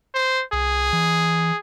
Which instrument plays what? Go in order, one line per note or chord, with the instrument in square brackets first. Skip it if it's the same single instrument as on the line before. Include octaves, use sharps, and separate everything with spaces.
[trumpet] C5
[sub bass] C2 [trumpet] G#4
[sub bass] E3